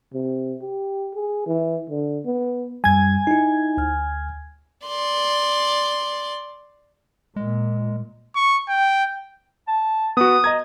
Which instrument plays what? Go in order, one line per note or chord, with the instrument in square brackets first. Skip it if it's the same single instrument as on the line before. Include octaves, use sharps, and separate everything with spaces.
[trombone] C3
G4
G#4
E3
D3
B3
[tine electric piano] F#2 G3 [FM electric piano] G#5 G#6
[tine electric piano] D#4 E4
D2 F6
[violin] D5 C6
[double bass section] A#2 [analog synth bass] G#3
[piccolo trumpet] C#6
G5
[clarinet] A5
[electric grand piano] B3 F#4 [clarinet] D#6
[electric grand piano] D#5 A#5 G#6